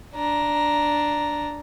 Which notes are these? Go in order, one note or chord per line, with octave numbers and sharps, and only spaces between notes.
D4 A#5